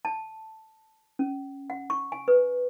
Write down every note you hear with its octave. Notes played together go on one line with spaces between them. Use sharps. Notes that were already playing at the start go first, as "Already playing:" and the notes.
A5
C#4
F#5
C#6
G#5
B4